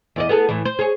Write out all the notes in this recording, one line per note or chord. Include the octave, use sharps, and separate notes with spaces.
E2 D5 D#5
B3 G#4 A4
A2 E3
C5
G#4 C#5